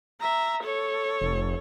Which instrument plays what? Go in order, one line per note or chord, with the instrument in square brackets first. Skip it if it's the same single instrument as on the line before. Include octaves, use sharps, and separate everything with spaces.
[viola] E5 A#5
A4 C#5
[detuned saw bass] F1